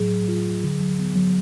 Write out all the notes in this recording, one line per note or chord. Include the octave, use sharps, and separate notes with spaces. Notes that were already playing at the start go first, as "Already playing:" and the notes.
Already playing: A2 F#3 G#4
F#3
F4
F#3
D3
F#3
B3
F#3